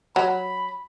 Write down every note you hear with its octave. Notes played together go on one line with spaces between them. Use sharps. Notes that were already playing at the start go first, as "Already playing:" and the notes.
F#3 B5